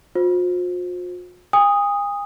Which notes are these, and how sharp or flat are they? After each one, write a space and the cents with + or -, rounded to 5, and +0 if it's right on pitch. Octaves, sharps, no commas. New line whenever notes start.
F4 +45 C5 +0
G#5 -40 D#6 +0